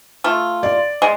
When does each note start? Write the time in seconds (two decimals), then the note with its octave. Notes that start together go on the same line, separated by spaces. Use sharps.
0.24 A3 F4
0.63 D5
1.02 G#3